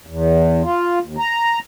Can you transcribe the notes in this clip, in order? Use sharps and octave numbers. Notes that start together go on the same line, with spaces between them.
E2
F4
D#2
A#5